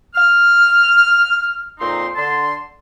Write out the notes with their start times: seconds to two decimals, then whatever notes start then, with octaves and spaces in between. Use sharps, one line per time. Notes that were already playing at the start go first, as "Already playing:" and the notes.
0.15 F6
1.79 F2 A#2 C4 D#4 C6
2.16 D3 A5 C6